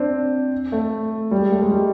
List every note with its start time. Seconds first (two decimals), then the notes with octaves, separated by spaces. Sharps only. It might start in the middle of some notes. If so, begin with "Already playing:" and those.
Already playing: C4 D4
0.72 A3
1.31 G3
1.42 G#3
1.52 A3
1.62 G#3
1.72 G3